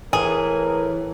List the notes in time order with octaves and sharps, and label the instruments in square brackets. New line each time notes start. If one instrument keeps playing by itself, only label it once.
[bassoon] A2 [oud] E3 [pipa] G#4 [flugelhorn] A#4